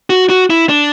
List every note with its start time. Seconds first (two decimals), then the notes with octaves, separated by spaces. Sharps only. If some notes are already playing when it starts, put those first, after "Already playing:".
0.10 F#4
0.30 F#4
0.50 E4
0.69 D4